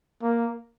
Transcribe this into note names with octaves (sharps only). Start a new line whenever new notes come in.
A#3